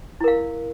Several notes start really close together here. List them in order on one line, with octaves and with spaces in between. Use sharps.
E4 A#4 F5